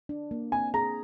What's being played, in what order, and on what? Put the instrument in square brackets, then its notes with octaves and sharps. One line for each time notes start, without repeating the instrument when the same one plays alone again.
[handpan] D4
A#3
[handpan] C4 [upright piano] G#5
[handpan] G#4 [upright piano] A#5